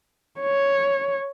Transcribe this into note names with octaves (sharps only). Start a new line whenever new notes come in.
C#5